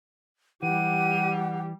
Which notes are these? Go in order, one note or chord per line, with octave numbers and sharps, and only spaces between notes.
E3 G3 G4 F#5 D#7